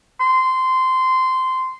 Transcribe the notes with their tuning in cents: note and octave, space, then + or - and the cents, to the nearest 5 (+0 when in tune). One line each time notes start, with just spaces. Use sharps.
C6 -15